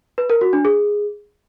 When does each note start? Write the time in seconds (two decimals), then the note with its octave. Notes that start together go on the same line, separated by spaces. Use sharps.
0.18 B4
0.30 A#4
0.41 F#4
0.53 D4
0.65 G#4